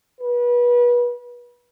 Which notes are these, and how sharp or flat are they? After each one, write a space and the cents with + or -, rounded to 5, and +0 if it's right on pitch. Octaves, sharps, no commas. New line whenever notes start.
B4 -30